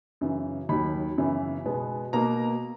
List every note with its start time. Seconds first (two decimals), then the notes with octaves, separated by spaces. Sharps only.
0.21 F#2 C#3 E3
0.69 D#2 D#3 F#3 B5
1.18 F#2 C#3 E3 B3
1.66 B2 G#3 B3
2.13 B2 A#3 A#5